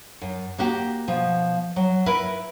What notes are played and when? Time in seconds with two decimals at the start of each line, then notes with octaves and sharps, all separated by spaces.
0.21 F#2
0.58 A#3 F#4 G4
1.08 B2 F3
1.76 F#3
2.06 E4 A#4 B4